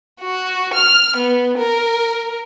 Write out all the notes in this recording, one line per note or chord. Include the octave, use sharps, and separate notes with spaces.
F#4
F6
B3
A#4